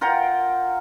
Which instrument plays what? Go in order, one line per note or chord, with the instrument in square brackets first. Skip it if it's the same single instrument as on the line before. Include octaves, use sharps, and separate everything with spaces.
[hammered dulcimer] F4 A#4 F#5 G5